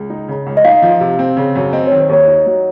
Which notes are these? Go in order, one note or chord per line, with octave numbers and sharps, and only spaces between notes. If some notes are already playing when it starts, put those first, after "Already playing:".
Already playing: C#2
D#4
C#3
C#2
D#5
D#4 F5
F3
C3
C4
C#3
F#2
C4 D#5
D#3 C#5
C5
D#2 C#5
D#4
F#3